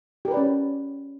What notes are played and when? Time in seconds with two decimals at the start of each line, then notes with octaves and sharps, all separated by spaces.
0.25 G4
0.28 A#4
0.31 B4
0.34 D5
0.37 C#4